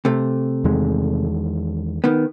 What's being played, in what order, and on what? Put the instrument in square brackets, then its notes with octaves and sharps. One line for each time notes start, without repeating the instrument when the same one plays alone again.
[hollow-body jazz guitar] C3 A3
[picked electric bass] E2 D#3 G#3
[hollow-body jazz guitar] D#3 B3